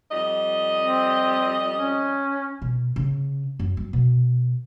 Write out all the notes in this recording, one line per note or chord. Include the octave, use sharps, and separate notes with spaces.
F2 G3 D#5
C4
C#4
B2
C#3
F#2
F#3
B2